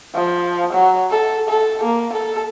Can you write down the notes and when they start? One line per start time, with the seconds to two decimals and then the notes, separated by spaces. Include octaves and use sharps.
0.15 F3
0.73 F#3
1.10 A4
1.49 A4
1.84 A#3
2.13 A4